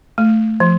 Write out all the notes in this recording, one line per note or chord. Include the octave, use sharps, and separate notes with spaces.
A3
F3